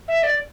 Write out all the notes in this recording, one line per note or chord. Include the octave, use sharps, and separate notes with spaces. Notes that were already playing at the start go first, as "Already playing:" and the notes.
E5
D5